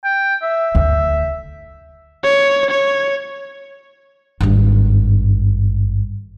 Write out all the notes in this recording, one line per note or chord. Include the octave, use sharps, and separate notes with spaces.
G5
E5
D2
C#5
C#5
G#1 G2